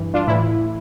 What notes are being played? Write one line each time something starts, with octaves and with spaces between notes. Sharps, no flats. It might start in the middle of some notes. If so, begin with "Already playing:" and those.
Already playing: G2 E3
D4 F4
A2 E3 E4